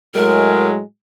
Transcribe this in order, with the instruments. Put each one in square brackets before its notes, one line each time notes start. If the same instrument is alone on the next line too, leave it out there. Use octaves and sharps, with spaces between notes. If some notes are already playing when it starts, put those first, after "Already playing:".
[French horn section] A2 F#3 G#3 [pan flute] A#4